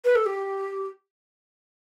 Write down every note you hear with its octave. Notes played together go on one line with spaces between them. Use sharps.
B4
A4
G4